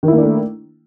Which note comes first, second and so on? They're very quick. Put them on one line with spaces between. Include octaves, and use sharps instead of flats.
D#3 E4 A#3 D4 A3